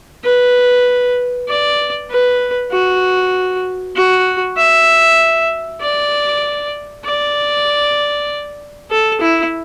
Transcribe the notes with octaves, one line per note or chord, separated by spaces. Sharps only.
B4
D5
B4
F#4
F#4
E5
D5
D5
A4
E4